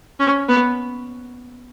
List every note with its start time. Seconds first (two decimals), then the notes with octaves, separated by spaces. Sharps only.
0.19 C#4
0.49 B3